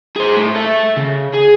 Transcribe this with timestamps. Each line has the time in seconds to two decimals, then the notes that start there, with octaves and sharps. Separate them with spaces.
0.16 G#4 C5
0.37 A2
0.56 A4 E5
0.97 C#3
1.34 G#4